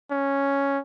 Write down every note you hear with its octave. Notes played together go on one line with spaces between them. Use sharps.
C#4